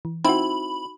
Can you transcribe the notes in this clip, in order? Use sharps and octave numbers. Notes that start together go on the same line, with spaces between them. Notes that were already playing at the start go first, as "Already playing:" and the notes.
E3
C4 D#4 E4 F#4 B5